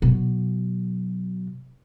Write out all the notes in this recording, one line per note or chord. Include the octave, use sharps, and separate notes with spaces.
B2 F#3